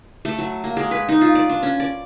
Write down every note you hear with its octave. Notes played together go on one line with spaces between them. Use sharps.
A3
F#3
A#3
G#3
B4
D#4
F4
D5
D4
C#4
D5